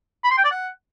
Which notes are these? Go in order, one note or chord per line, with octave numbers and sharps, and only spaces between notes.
B5
C6
G5
D5
F#5